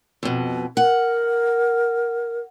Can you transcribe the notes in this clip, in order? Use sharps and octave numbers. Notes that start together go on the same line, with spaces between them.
F2 B2
A#4 F#5